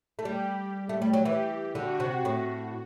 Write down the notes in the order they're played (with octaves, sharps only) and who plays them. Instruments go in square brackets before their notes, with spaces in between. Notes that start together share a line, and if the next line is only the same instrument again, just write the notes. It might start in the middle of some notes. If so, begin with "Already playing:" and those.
[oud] A3
[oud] G3 [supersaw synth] G4
[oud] A3
G3
F#3
[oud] E3 [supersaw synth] G4
[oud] D3 [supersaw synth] F#4
[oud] C3
A2